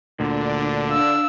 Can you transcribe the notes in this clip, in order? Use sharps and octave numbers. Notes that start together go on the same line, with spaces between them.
D2 A#2 D3 D4
F5 E6